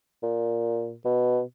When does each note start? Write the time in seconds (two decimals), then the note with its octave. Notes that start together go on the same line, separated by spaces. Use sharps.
0.23 A#2
1.05 B2